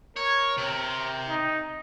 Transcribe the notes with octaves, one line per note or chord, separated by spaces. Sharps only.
A#4 C#5
C3
D#4